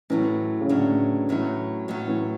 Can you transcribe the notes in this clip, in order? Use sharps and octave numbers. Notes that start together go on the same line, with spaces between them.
A2 E3 F#3 C#4
C#3
A2 D3 F#3 C#4
A2 E3 F#3 C#4
A2 F#3 C#4
E3